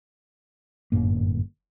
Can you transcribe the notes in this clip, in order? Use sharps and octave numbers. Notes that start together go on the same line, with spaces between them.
G1 F#2 A2 A#3